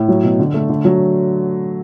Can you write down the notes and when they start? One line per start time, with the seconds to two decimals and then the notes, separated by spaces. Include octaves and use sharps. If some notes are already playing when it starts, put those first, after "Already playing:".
Already playing: A2
0.09 F#3
0.24 B2
0.39 D3
0.54 A3
0.69 D3
0.85 F#3